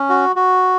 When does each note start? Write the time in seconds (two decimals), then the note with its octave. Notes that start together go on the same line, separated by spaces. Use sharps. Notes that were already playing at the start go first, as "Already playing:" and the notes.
Already playing: C#4
0.09 F#4
0.36 F#4